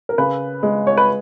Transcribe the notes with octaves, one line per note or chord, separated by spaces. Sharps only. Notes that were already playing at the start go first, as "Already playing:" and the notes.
A#4
C#3 B4
G#3
C#5
B4